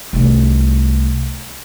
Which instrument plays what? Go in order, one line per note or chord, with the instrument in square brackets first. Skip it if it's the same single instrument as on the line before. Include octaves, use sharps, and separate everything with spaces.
[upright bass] C2 A3